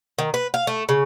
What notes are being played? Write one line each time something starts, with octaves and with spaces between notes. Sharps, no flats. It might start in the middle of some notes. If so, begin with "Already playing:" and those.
D#3
B4
F5
A3
C#3